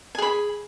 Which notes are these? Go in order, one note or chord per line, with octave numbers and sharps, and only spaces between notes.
G#4 G#5 B5